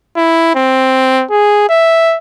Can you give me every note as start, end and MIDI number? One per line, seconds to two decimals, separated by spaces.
0.16 0.50 64
0.55 1.24 60
1.31 1.64 68
1.69 2.17 76